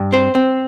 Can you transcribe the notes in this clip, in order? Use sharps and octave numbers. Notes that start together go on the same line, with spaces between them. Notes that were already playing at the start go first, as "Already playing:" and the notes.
Already playing: G2
C4 C5
C4